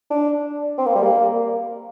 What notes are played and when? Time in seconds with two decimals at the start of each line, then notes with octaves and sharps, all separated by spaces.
0.10 D4
0.78 C4
0.86 A#3
0.95 G3
1.03 A#3